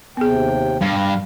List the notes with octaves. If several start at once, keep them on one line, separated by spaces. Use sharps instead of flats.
D#2 C3 B3 G#4 G5
G2 F5